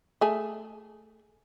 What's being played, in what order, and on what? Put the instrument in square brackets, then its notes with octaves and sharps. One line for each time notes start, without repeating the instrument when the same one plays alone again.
[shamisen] A3 G#4